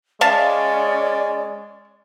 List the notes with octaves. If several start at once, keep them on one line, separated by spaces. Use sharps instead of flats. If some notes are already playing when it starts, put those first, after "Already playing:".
G#3 C#4 D5 E5 F5 A5